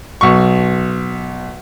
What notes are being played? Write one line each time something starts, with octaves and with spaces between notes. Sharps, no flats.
B1 C#6